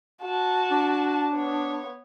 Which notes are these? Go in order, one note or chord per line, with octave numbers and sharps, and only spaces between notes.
F#4 A5
D4
B3 C#5